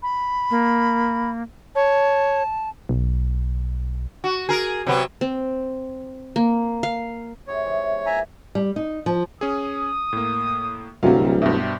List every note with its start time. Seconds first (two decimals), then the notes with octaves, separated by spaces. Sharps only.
0.03 B5
0.51 A#3
1.75 C#5 A5
2.89 B1
4.24 F#4
4.49 G#4 A#4
4.87 C3 F#3 B3
5.21 C4
6.36 A#3
6.83 F5
7.47 G#2 C3 C#5 D#5
7.64 E3
7.90 B2
8.06 E3 F3 A#3 E5 G#5 A#5
8.55 G3
8.76 D#4
9.06 F3
9.41 C#4 G#4 D#6
10.13 A2 A#3
11.03 D1 C2 F#3 G3 F5
11.42 G2 B2 C4 D4 G4 E5